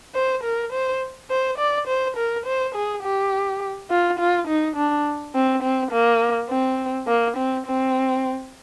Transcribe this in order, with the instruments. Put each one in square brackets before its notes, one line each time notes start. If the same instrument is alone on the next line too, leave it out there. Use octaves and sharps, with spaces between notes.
[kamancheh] C5
A#4
C5
C5
D5
C5
A#4
C5
G#4
G4
F4
F4
D#4
D4
C4
C4
A#3
C4
A#3
C4
C4